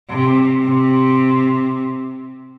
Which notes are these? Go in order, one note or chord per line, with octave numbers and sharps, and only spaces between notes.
C3
C3